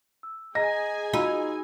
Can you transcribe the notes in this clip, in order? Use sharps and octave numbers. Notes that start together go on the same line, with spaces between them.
E6
G#4 D#5 G#5 A#5 A#6
D#4 F4 F#4 B5 E6